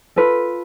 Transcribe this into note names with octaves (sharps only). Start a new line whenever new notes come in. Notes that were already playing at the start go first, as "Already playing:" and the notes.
F4 A4 B4